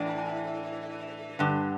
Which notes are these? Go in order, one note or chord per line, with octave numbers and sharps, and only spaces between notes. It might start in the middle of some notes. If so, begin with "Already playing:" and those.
Already playing: A2 E3 D4
G2 D3